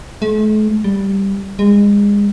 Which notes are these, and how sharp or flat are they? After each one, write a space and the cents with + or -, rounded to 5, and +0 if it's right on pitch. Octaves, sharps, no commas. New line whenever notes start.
A3 -45
G3 +0
G#3 -30